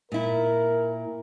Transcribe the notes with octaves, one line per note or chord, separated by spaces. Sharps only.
A#2 E4 A#4